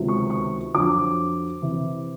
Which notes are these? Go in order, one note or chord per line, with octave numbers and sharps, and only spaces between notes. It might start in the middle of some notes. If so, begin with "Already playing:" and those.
Already playing: C#2 C3 D#3 F#3 B3
C#6
C#6
F2 D3 F#3 D6
C3 E3